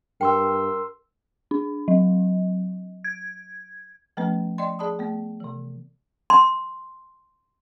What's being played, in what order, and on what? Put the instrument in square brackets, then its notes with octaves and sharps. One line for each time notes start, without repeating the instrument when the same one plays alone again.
[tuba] G2 [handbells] A#4 C6 E6 [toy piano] G5
[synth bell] D4
F#3
G#6
[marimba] F3 A3 B3 C#4 B4
D5 D#5 G5 C6
G#4 D5 A5 B5 D#6
A3 B3
C3 E3
[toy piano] C6